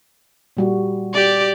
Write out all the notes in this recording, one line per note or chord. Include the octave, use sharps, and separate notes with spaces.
A#2 G3 F#4
G4 D5